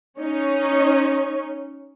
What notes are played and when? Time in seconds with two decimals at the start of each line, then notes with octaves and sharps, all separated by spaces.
0.17 C#4 D#4 C#5